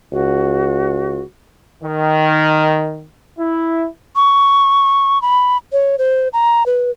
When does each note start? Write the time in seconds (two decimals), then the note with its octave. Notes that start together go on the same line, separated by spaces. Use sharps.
0.12 C#2 F#4
1.83 D#3
3.39 E4
4.16 C#6
5.22 B5
5.72 C#5
5.98 C5
6.33 A#5
6.66 B4